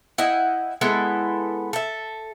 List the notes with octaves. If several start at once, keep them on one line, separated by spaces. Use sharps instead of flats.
E4 D#5 F#5 G5
G#3 B3 E4 A4
A4 E5